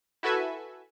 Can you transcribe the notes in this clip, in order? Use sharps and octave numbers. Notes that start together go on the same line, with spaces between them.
E4 F#4 A4 B4 E5 G#5